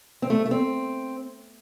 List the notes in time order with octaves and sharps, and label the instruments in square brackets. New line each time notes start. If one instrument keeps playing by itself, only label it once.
[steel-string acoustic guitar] C4
A3
A3
C4